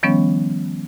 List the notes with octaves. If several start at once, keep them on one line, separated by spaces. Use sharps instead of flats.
D#3 F3 G3 B3 C#4 C#5